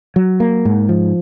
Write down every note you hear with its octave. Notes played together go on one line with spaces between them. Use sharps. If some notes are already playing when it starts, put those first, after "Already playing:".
F#3
A#3
G#2
F3